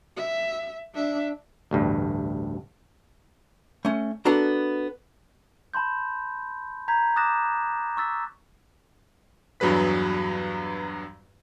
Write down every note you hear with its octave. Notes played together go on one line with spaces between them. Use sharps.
E5
D4 E5
A1 D2 G2
A3 C#4
B3 D4 F#4 A4 A#5
A5 B5 C6 G6
A#5 G6 G#6 B6
D6 D#6 F#6 A6 A#6 E7
C#6 E6 A6 B6
E2 G2 F#3 G#4 B4 B6